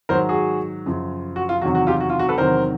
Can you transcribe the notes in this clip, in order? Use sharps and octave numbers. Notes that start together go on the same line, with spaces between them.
G#2 D#3 F#3 A#4 C5
F#4 G#4
F#2 C#3 F3
F#4
F4
E2 C3 D#3 F#3 F#4
F#4
F4 G4
F#4
F4
F#4
A4 B4
E2 C3 D#3 F#3 A#4 C5